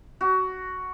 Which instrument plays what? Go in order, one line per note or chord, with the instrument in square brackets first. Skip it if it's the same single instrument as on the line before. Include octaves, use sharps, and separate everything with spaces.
[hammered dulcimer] F#4